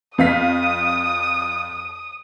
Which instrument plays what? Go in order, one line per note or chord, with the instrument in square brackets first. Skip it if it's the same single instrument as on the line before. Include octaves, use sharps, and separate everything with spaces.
[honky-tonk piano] F2 F5 B6 [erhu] D#6